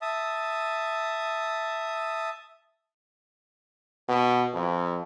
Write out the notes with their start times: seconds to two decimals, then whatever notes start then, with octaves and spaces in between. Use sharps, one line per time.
0.02 E5 A5 D#6
4.09 B2
4.54 F2